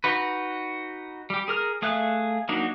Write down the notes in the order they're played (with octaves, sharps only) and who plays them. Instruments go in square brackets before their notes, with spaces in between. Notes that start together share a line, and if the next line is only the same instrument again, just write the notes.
[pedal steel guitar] D#4 F#4 B4
G3 G4
G#4 A#4 F6
A3 G#4 E5 F5 F#6
F#3 A#3 D4 D#4 F#4